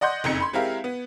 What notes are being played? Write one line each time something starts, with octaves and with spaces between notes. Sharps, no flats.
D5 D#5 F#5 C6 G6
F#1 F2 D#4 G#6 C#7
B5 C6
G#3 C4 E4 G4 A#4 F5
B3